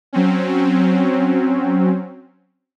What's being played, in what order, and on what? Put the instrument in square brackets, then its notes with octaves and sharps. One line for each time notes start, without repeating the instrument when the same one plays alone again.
[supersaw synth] F#3 C4 C#4